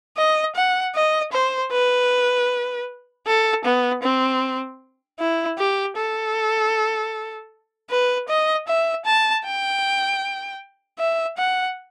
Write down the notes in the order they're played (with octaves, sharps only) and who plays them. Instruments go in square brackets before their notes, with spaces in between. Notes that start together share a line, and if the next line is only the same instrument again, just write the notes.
[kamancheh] D#5
F#5
D#5
C5
B4
A4
B3
C4
E4
G4
A4
B4
D#5
E5
A5
G5
E5
F#5